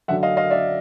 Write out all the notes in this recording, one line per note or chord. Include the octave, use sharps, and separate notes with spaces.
F#2 D3 F#3 E5 F#5
D#5 F5
D#5 F5
D5 E5